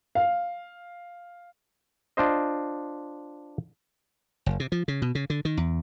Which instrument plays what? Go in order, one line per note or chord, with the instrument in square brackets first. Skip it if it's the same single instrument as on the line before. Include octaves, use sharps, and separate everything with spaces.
[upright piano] F5
[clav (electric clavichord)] D4 F4 C5 D#5
[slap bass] F#1
C3
F3
C#3
B2
C#3
D3
D#3
E2